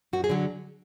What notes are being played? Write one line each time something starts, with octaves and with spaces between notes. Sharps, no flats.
F#2 F#4
G#4
D3 F#3